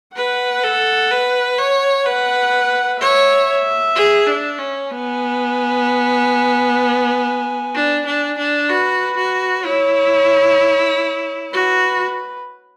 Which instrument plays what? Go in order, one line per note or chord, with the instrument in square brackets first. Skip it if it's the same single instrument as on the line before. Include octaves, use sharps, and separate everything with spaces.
[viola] B4 [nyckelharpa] F#5
[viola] A4
B4
C#5
[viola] B4 [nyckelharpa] F#5
[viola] C#5 [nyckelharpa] E5
[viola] G#4
D4
C#4
[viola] B3 [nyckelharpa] G#5
[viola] D4
D4
D4
[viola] F#4 [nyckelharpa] B4
[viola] F#4
[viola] E4 [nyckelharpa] C#5
[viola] F#4 [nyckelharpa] B4